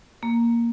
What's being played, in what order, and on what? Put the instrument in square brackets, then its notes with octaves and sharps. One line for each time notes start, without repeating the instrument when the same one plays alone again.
[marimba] A#3